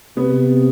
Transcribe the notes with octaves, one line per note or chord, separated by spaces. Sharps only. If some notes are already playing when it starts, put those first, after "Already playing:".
C3 B3